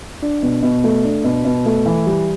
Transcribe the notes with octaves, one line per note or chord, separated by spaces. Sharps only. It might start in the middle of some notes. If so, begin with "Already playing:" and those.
D4
B2
B2
A3
D4
B2
B2
A3
E3
G3